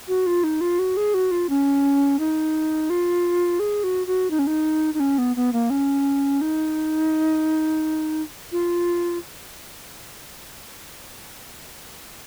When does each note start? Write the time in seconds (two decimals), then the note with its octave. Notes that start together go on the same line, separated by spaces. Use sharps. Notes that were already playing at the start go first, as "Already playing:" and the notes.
0.08 F#4
0.26 F4
0.44 D#4
0.61 F4
0.79 F#4
0.97 G#4
1.14 F#4
1.31 F4
1.49 C#4
2.19 D#4
2.90 F4
3.59 G#4
3.84 F#4
4.07 F#4
4.30 D#4
4.39 C#4
4.47 D#4
4.94 D#4
5.00 C#4
5.18 B3
5.36 B3
5.53 A#3
5.70 C#4
6.41 D#4
8.52 F4